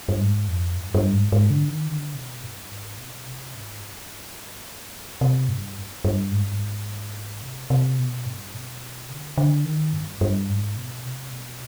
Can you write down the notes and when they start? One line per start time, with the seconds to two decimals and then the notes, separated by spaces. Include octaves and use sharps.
0.09 G2
0.21 G#2
0.48 F2
0.77 G2
0.94 G2
1.13 G#2
1.32 G#2
1.50 D3
1.69 D#3
1.87 D3
2.14 B2
2.43 G2
2.71 G#2
2.98 B2
3.26 C3
3.54 G#2
3.81 G2
5.21 C3
5.49 G2
6.05 G2
6.32 G#2
6.42 G2
6.51 G#2
7.42 C3
7.70 C3
7.99 B2
8.26 G2
8.54 B2
9.10 D3
9.38 D3
9.65 D#3
9.94 G2
10.21 G2
10.49 G#2
10.77 B2
11.05 C3
11.31 B2